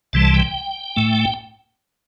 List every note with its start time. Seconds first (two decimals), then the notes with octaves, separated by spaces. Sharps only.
0.13 C2 C3 E3 G3 A5
0.34 G5
0.96 A2 A3